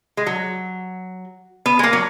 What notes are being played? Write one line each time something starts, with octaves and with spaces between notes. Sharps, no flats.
G#3
F#3
B3
G#3
A#3
F#3